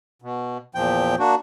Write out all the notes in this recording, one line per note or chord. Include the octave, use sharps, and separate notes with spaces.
B2
E2 A#2 F3 G5
A#3 D4 F#4